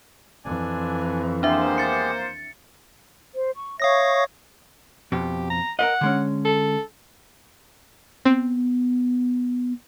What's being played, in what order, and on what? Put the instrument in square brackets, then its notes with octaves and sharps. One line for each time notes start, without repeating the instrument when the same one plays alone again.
[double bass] F2 E3 [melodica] D4 D5 G#5
[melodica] G#3 B3 G4 [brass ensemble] A#3 C5 [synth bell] D4 E5
[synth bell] A6 C#7
[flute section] C5
C#6
[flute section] C#5 E5 C#6 [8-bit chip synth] F5 D#6 A#6
[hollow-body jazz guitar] F2 B2 [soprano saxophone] G4
[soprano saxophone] A#5
[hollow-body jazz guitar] A#4 B4 D#5 [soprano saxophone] F#5
[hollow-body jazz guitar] D3 G#3 C#4
[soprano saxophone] A4
[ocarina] B3 [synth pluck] C4